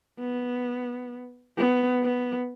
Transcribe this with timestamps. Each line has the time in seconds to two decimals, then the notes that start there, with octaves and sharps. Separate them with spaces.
0.19 B3
1.57 B3
2.03 B3